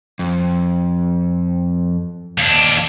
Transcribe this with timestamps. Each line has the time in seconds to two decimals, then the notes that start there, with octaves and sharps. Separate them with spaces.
0.19 F2
2.38 D#2 D4